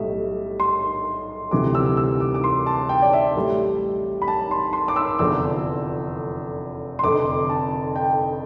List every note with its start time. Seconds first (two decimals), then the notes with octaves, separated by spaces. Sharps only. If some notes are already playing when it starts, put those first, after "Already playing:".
Already playing: B1 A2 G3 E5
0.60 C6
1.51 D2 C3 E3 G3 D6
1.75 E6
1.97 E6
2.20 D6
2.34 D6
2.44 C6
2.66 A5
2.89 G5
3.02 D5
3.13 E5
3.35 A1 A2 G3
4.22 B5
4.28 A5
4.51 C6
4.73 C6
4.88 D6
4.96 E6
5.19 F1 E2 D3 F3 E6
6.99 C6
7.03 F1 F2 D3 D6
7.50 A5
7.96 G5